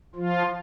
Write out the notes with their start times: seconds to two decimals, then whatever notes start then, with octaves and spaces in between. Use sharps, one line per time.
0.15 F3 F4